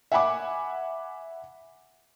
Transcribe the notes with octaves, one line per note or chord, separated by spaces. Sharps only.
E5 F#5 G#5 B5 D6